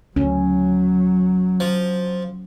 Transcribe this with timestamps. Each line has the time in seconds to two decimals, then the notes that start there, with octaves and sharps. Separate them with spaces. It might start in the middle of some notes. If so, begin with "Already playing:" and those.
0.16 D2 F#3 C#4
1.60 F3